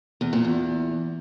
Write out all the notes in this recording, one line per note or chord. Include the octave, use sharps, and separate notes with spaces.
E2
A#2
E2